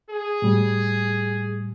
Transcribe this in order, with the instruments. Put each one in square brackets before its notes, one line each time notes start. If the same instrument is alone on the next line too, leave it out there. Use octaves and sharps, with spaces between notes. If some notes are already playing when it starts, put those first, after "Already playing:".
[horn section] G#4
[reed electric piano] A2 G3